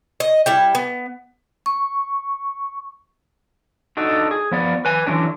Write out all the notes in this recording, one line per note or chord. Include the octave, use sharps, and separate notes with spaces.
D#5
G3 E4 G5
B3
C#6
D4 D#4 F#4 A4
G#4
F3 B3 D5
B4 G#5
D3 E3 F#3 C#4 D4